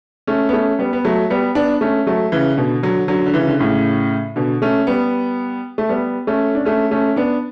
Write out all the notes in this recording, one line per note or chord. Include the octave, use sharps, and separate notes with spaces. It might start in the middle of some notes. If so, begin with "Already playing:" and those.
A3 C#4
B3
A3 C#4
G3 B3
B3
F#3 A3
G3 B3
B3 D4
A3 C#4
F#3 A3
C#3 E3
B2 D3
D3 F#3
D3 F#3
D3
C#3 E3
D3
A2 C#3
B2 D3
A3 C#4
G3 B3
A3
G3 B3
A3 C#4
D4
A3 C#4
A3 C#4
B3 D4